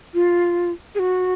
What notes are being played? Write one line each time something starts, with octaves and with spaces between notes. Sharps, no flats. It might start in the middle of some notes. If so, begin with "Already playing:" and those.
F4
G#4
F#4